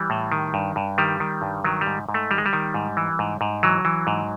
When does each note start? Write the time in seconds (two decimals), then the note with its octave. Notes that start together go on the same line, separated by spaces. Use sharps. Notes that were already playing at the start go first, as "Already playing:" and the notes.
Already playing: E3 G3
0.10 A2
0.32 D#3
0.54 G2
0.76 G2
0.98 D#3 G3
1.20 D#3
1.42 G2
1.64 D#3 F#3
1.81 G3
1.86 G#2
2.09 G#2
2.14 A3
2.31 D#3 G3
2.38 G#3
2.46 G3
2.53 D#3
2.74 G#2
2.97 E3
3.19 G#2
3.41 G#2
3.63 E3 F#3
3.85 E3
4.07 G#2